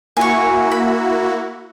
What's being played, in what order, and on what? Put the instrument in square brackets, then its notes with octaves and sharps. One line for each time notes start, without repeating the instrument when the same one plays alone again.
[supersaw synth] A#3 E4 F#4 [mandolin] G#5 C#6
[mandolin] B5